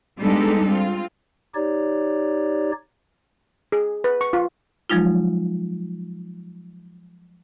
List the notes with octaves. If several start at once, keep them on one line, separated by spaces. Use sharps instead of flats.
G3 G#3 B3 D4 D#4 A4
C4 F4
D#4 G4 C#5 D5
G#4
B4
C#6
F4
F3 F#3 G#3 D#4 F4